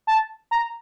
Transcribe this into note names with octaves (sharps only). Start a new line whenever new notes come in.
A5
A#5